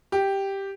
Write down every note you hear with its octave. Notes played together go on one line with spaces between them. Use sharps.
G4